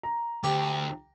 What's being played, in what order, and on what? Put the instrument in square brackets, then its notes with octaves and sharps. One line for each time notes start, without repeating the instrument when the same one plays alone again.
[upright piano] A#5
[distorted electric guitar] D2 [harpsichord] G4